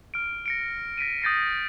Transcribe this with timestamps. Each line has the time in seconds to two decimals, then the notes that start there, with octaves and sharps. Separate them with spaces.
0.14 F6 D7
0.46 A#6 C#7 D7
0.98 A#6 B6 D7 D#7
1.22 D#6 G6 A6 A#6 C7 C#7